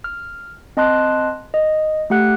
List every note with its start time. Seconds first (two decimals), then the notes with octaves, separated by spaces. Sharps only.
0.04 F6
0.77 C4 D#5 A5 C6 F#6
1.54 D#5
2.10 A3 G4 F#5 F#6